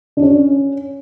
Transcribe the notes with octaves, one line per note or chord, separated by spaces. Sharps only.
D4
C#4